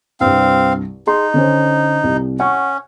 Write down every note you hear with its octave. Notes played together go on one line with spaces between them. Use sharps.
C2 G2 C4 F5
D#4 G#4 C6
D3 C#4 C5
C2
C#4 F#5 C#6